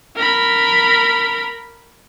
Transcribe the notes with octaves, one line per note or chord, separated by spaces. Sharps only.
A#4 B5